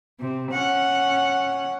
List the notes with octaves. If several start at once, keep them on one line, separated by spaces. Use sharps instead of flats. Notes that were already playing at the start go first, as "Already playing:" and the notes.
C3
C#4 F#5